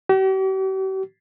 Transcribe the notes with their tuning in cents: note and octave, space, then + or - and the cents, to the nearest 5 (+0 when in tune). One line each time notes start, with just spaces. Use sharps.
G4 -45